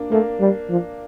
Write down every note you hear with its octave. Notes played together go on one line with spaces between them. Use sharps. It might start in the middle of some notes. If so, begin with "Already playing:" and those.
Already playing: A#3 D4
A3 A#3
G3
F3